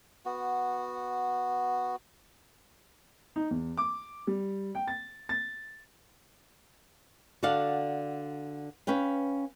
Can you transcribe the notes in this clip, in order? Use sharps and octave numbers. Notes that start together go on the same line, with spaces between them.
B3 F#4
D#4
E2
D6
G3
G5
A6
A6
D3 F#4 A4 D5 F5 F#5
C#4 B4 F5 G5